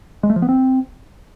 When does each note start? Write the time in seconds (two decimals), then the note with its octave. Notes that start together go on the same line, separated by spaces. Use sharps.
0.23 G#3
0.30 A3
0.36 F3
0.42 B3
0.49 C4